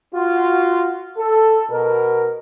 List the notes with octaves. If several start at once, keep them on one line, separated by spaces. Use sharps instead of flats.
F4 F#4
A4
B2 A#4